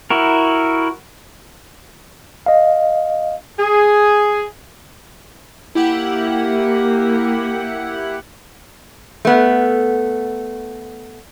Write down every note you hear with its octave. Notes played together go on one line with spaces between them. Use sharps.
E4 F#4 A#4
D#5 F5
G#4
A#3 E4 G4 F#5
A3 B3